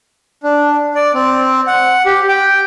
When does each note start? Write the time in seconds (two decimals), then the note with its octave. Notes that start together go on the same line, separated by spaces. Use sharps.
0.43 D4
0.95 D5
1.14 C4
1.67 F#5
2.06 G4
2.28 G5